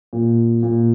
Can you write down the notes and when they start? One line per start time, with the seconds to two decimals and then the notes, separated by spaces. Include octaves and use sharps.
0.13 A#2
0.63 A#2